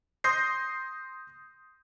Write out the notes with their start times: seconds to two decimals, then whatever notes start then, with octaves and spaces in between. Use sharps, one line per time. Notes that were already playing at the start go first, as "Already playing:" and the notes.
0.24 C6 D#6 G6 A#6 C7